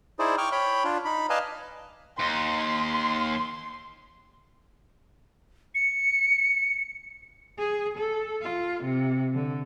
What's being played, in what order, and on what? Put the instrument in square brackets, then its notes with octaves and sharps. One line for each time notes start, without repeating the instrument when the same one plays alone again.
[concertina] D#4 E4 G#4 C5 D5
G5 C#6 D6 F6
C#5 G5 B5
D4 F4
D#4 B5
B4 D5 D#5 F5 G#5 A5
[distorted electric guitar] D#2 [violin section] C6
[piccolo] C#7
[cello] G#4
A4
F4
C3
D3